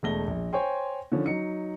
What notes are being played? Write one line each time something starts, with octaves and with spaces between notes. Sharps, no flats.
E1 A3 A#6 G7
A#1
C5 C#5 G5 G#5 C6
D3 D#3 F3 C#4
F#3 D#4 C#7